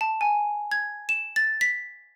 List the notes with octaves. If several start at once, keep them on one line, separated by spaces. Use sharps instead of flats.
A5
G#5
G#6
E7
A6
B6